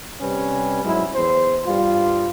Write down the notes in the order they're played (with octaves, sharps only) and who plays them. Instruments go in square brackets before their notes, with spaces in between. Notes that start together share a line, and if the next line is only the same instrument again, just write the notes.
[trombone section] C3 G3 C#4 B4
G#2 F#3 G#3 E4
E2 C5
G2 G3 F4